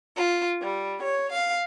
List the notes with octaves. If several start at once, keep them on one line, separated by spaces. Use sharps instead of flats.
F4
G3
C#5
F5